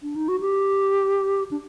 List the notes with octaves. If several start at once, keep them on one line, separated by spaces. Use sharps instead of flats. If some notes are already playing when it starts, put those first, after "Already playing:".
D4
D#4
F#4
G4
D4